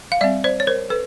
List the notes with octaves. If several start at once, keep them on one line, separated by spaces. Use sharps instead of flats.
F5
G3 C4 D5 E5
C5 D5
C#5
A#4 C5
A4 B4